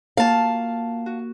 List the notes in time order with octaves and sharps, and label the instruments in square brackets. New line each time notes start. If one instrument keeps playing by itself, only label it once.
[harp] A#3 F4 F#4 [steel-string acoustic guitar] F5 A5
[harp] F#4